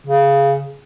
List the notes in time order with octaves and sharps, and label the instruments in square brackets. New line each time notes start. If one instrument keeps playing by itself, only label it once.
[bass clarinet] C#3